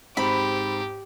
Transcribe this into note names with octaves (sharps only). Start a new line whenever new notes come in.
G#2 C4 G4 B5